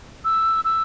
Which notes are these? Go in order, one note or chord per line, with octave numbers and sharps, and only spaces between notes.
E6
E6